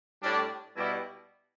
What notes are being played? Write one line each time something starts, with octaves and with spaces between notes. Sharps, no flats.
A2 G3 D4
B2 G3 E4